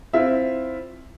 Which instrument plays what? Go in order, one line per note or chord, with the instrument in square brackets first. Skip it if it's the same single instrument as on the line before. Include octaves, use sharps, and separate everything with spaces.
[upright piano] C4 E4 F4 E5